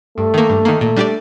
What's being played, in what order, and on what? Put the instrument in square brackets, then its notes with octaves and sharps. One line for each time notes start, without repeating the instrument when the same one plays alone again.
[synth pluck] G2 [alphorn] A3
[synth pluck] D#3 A#3
G2
D#3 A#3
[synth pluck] A#2 [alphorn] A3
[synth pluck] G3 D4 G4 D5